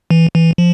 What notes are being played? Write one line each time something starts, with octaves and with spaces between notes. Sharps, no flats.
E3
E3
F3